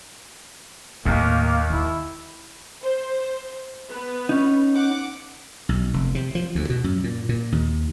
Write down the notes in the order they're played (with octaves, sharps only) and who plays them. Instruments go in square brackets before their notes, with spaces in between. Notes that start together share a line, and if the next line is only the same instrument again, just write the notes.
[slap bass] D#2 [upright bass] A2 D#3 [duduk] A#3
[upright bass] D#3 [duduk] E4
[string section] C5
B3 B4
[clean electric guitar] C#4 D#4
[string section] F#5 D6
[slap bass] B1
F1
C3
F3
D2
B2
F#2
A#2
A#2
D#2